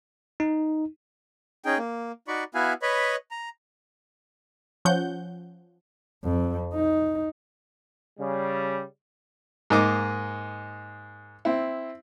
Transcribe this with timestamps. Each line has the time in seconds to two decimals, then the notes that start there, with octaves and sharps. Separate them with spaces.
0.40 D#4
1.65 C#4 D#4 G#4 G5
1.78 A#3
2.28 D#4 F#4 D5 B5 C#6
2.55 B3 E4 F#4 E5 F5 G#5
2.82 B4 C#5 D#5 B5
3.31 A#5
4.85 F3 C#4 F#5 G6
6.24 F2
6.74 D#4
8.19 C#3 G3
9.70 G#2 A#3 D#5 D6
11.45 C4 E4